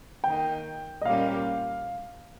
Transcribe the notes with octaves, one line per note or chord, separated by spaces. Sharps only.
D#3 A#3 D#4 G5
D#5
A#2 G3 A#3 C#4 F5